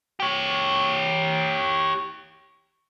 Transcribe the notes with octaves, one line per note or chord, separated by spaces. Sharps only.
G4 C#5